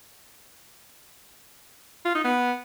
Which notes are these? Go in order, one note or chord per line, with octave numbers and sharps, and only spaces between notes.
F4
D#4
B3